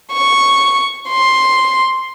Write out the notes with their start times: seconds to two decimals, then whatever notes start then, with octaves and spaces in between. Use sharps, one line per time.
0.13 C#6
1.10 C6